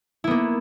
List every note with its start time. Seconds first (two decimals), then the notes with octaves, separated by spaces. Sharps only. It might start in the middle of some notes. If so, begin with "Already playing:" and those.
0.24 E4
0.27 B3
0.31 A#3